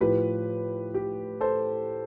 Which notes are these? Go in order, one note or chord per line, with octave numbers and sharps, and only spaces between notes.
A2 F3 G4 B4
G4
A4 C5